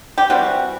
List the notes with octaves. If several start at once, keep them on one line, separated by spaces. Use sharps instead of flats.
G4
E3 G3 C4 F#4